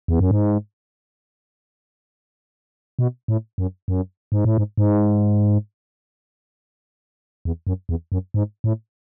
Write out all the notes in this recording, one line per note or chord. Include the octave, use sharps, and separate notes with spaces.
E2
F#2
G#2
B2
A2
F#2
F#2
G#2
A2
G#2
G#2
E2
F#2
E2
F#2
G#2
A2